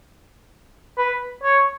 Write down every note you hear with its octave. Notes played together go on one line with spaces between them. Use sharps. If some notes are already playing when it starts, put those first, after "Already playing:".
B4
C#5